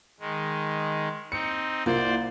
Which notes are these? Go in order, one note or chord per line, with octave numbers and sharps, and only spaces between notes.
D#3 G#3
C4 D#4 C#7
C2 A#3 F4 C5 D5